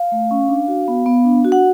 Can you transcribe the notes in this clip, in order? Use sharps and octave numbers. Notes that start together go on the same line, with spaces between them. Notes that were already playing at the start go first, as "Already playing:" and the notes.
Already playing: F5
A3
C#4
D4
F#4
B3
B3
D4
F#4
F#5